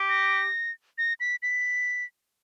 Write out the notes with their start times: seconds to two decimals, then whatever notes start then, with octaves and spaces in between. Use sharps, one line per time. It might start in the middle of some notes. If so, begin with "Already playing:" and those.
Already playing: G4
0.09 A#6
0.98 A#6
1.20 B6
1.42 B6